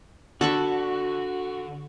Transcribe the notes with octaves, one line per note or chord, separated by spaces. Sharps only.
D3 F#4 A4 B5 C#6